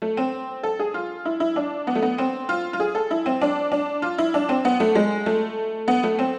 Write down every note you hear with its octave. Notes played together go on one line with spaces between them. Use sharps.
A3
C4
A4
G#4
F4
E4
E4
D4
B3
A3
B3
C4
F4
F4
G#4
A4
E4
C4
D4
D4
F4
E4
D4
C4
B3
A3
G#3
A3
B3
A3
C4